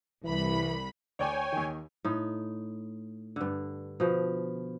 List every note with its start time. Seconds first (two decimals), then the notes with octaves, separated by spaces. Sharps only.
0.24 C2 E3 B5
1.19 D2 C#5 D5 G5 G#5 D6
1.52 D#2 D#3
2.05 A2 D#4
3.36 G2 D3
4.00 B2 F3